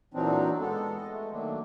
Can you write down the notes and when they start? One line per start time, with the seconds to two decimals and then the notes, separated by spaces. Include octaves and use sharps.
0.14 A#2 E3 F#3 C4 D4 D#4
0.59 G#3 B3 A4
0.96 D#5
1.09 G#3 A3
1.31 D#3 F#3 A3 A#3 D4